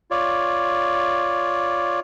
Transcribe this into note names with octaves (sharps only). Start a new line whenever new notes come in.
F4 C#5 D5